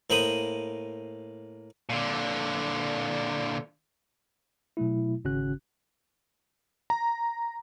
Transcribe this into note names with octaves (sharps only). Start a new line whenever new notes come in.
A2 A#3 C5 B5 D#6
A#2 D3
B2 F#3 A3 E4
G#1 C#3 C#4 F#4 F#6
A#5